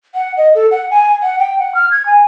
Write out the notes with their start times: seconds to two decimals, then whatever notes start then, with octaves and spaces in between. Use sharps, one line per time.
0.15 F#5
0.37 D#5
0.55 A4
0.71 F#5
0.91 G#5
1.22 F#5
1.39 G5
1.59 F#5
1.75 F6
1.91 G#6
2.06 G#5